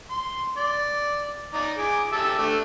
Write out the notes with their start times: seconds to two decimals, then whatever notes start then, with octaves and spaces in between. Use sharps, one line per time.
0.11 C6
0.57 D5
1.54 D#4 D5
1.78 G#4 D6
2.13 G4 E5 A5
2.39 A3 D4